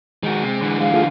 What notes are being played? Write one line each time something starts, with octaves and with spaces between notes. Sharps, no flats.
D#3 G#3 F#4
C3
D3 E3
G#3 F5
A3 F4 G#4